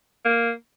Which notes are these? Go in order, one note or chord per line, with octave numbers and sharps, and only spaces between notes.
A#3